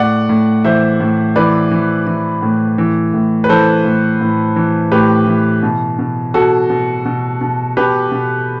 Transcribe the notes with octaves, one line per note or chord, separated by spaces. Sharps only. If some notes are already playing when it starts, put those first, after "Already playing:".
Already playing: A2 D5 F#5
A2
E3 C5 E5
A2
E3 B4 D5
E3
E3
A2
E3
A2
B4
E3 A4 C5
A2
A2
E3
A2 G4 B4
E3
B2
B2
B2 F#4 A4
B2
B2
B2
B2 G4 B4
B2